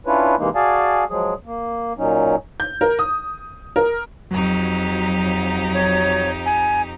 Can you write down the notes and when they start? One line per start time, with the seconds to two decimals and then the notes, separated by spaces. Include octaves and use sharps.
0.07 C#4 D4 E4 F4 B4 C#5
0.38 C3 E3 G#3 A#3 D#4
0.55 F#4 G#4 D5 F5 G#5 A5
1.10 F3 F#3 G#3 G#4
1.45 A#3
1.98 A#2 F#3 C#4 D#4
2.60 G6
2.81 A#4
2.99 D#6
3.76 A#4
4.31 F2 F#3 D#4 G4
5.74 C#5
6.46 G#5